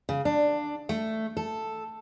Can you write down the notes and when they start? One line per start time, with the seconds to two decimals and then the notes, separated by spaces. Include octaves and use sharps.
0.09 C#3
0.25 D4
0.89 A3
1.37 A4